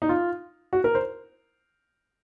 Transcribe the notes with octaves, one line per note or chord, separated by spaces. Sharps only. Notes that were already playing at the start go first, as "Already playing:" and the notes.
D#4
F4
F#4
A#4
C5